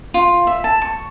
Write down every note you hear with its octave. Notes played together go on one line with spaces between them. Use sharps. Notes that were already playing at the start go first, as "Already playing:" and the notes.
F4
E5
A5
C#6